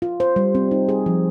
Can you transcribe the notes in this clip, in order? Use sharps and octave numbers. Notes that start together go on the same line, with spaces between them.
F4
C5
G3
C4
D#4
G#4
F3